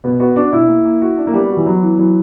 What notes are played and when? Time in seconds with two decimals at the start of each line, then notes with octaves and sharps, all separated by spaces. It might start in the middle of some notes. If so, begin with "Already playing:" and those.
0.04 B2 B3
0.20 B3 F#4
0.36 D4 F#4
0.53 B2 E4
0.68 A#3
0.85 A#3
1.02 F#4
1.17 D4
1.27 A#3
1.34 G3 B3
1.50 F#4
1.57 E3
1.66 F#3 B3
1.82 E3
1.99 E3 F#3